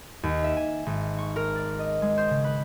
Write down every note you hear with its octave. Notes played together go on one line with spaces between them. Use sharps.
D#2
E5
G#5
G#1
C#6
A#4
D5
D#5
G#3
C5
C#3
B4